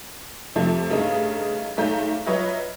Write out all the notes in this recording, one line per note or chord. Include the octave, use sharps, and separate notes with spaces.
F2 C3 F3 A3
G2 C#3 A3 D#4
B1 G#2 A3 A#5 G6
F#3 F4 B4 C#5 D#5 E5